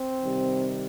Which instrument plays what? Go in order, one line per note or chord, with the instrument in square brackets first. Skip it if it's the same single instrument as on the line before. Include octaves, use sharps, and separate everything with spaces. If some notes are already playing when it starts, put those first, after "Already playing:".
Already playing: [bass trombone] C4
[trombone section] C3 D#3 G3